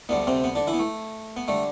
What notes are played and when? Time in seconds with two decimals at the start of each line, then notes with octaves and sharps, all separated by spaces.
0.09 D2 D3 G3 B3
0.27 C3 C4
0.44 B3
0.55 D3 D4
0.67 E3 E4
0.73 B3
0.79 A3
1.37 B3
1.48 D3 G3 A3